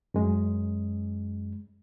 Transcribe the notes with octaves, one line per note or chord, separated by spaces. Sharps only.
F#2 G#3